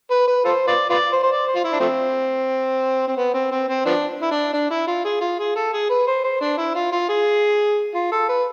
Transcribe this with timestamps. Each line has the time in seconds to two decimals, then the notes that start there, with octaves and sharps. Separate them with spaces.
0.10 B4
0.27 B4
0.45 F4 A4 C5
0.67 F4 B4 D5
0.90 F4 B4 D5
1.13 C5
1.23 C5
1.30 D5
1.47 C5
1.55 F4
1.64 E4
1.73 D4
1.80 F3 A3 C4
3.08 C4
3.17 B3
3.34 C4
3.51 C4
3.69 C4
3.86 F3 B3 D4
4.22 E4
4.31 D4
4.54 D4
4.71 E4
4.88 F4
5.05 G#4
5.21 F4
5.39 G#4
5.56 A4
5.73 G#4
5.90 B4
6.07 C5
6.24 C5
6.41 D4
6.58 E4
6.76 F4
6.92 F4
7.09 G#4
7.95 F4
8.12 A4
8.29 B4